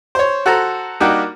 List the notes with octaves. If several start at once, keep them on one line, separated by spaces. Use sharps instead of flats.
C5 C#5
F#4 A4 C5 A#5
G3 A#3 D4 D#4 F#4 G4